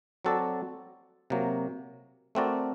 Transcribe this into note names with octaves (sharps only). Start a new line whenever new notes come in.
F#3 C4 F#4 A4 D5
C3 F#3 A#3
A3 C4 F#4 A#4 D5